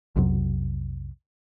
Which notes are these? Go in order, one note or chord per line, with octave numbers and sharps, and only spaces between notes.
B1 F2 C3 F#3